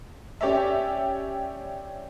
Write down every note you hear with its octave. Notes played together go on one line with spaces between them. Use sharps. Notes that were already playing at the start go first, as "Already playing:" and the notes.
C#4 G4 C#5 D5 E5